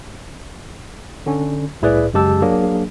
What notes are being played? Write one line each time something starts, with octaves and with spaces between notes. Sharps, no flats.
D3 C#4
C2 A2 E4 G#4 B4 D5
F#2 C#3 G#3 G4 A5 E6
F#3 A#3 D4 G#4